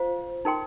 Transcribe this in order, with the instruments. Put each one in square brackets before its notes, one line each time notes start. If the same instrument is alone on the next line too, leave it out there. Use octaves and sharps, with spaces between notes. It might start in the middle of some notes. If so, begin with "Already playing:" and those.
Already playing: [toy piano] F4 C5 F5
D#4 A#4 G5 C6